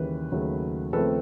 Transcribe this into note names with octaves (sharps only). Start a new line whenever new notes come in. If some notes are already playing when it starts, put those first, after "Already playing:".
Already playing: D#2 C#3 E3 G3 B4
D#2 C#3 F#3 A3
D#2 C#3 F3 A3 C4 A4 B4